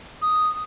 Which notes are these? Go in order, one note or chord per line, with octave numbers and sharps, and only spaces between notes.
D#6